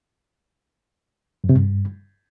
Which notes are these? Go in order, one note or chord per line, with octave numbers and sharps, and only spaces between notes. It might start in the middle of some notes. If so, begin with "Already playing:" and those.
F#2
C3
G2